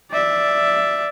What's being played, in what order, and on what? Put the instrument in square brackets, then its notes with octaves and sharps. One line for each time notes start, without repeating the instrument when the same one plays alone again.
[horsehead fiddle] D5 E5